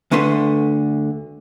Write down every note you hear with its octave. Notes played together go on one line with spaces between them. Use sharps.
D2 D3 A3 B4 C6